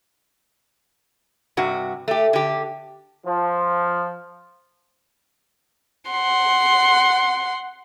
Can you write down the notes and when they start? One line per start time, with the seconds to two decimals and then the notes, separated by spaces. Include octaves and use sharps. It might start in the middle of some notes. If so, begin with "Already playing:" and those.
1.57 G2 C3 F#4
2.08 A3 G4
2.33 D3 G4
3.26 F3
6.11 F#5 C6